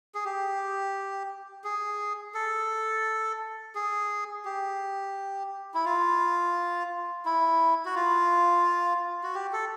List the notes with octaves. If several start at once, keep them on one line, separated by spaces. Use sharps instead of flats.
G#4
G4
G#4
A4
G#4
G4
E4
F4
E4
F#4
F4
F#4
G4
A4